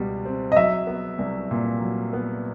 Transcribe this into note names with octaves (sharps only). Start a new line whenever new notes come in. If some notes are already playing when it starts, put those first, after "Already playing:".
Already playing: C#2 B2 G3
C4
D#5
F#3 E5
B3
C2
A#2
F#3
B3